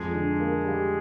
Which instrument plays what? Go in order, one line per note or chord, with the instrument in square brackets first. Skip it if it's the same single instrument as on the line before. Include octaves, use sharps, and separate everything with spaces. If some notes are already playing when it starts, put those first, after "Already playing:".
Already playing: [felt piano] F2 [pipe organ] G#3 G#4
[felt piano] D3
A#3
G3